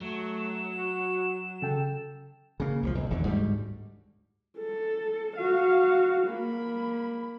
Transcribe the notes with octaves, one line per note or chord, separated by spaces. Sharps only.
F#3 A3 E7
F#4
C#3 A4 G5
C#3 A#3
C2 D3 F3
B1
E1 D#2 D3
D2 G#2 G3
A4
F#4 F5
A#3 B5